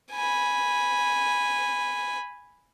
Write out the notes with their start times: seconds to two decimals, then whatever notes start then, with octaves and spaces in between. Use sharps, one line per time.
0.12 G#5 B5